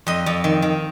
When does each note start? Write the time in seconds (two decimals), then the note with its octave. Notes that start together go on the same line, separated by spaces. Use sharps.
0.07 F2 D#5
0.26 F2
0.44 D#3
0.62 D#3